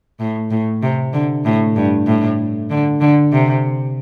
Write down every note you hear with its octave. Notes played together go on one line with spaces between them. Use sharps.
A2
A2
C3
D3
A2
G2
A2
D3
D3
C3